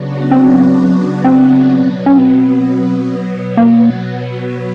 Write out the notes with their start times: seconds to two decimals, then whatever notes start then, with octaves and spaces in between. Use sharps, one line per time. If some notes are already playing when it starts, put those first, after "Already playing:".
Already playing: C#3 F#3 B3 D4 F#4
0.31 C4
1.24 C4
1.72 B2 F#3 B3
2.06 C#4
2.18 C4
3.57 A#3